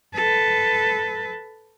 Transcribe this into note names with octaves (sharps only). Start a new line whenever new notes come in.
A4 B4